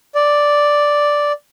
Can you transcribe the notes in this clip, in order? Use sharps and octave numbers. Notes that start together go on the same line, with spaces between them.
D5